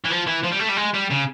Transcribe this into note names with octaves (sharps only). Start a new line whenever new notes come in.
E3
F3
E3
F3
G3
A3
G3
G#3
G3
C#3